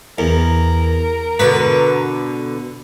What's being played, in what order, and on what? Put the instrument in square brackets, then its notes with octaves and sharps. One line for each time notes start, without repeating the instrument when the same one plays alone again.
[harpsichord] E2 [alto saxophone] A#4
[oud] B2 D3 B3 [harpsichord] B4